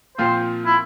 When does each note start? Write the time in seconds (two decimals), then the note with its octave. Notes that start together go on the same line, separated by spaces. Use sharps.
0.18 A#2 F3 C4 F4 C5
0.66 E4